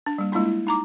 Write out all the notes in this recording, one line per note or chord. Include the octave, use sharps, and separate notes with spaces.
D4
G3 A#3
G#3 A#3 D4 E4 F4
E4
D#4 A#5 D6